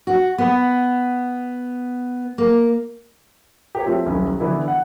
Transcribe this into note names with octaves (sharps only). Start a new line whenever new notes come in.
F#4
B3
A#3
G4 C#5
F3 A3 C4
D#1 B1 C#4 E4
D3 E3 B3 E4 E5
F#5